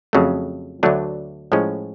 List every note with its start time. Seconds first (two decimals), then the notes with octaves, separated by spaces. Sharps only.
0.13 F2 C#3 F#3 A3
0.83 D2 D3 F#3 A3 D4
1.52 A2 F3 G#3 C#4